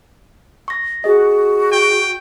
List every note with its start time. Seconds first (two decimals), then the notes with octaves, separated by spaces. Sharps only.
0.68 C#6 A#6
1.04 F#4 G#4 D#5
1.72 G5